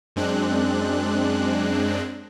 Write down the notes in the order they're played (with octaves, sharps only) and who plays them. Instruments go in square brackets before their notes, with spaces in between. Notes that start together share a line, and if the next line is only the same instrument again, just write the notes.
[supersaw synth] F#2 G#3 C4 D4 F#6